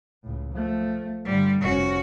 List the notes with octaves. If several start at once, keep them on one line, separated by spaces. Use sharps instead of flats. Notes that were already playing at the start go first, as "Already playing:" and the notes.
C#2 A2
F3 A3
G2 D3 G3
F1 C#4 F#4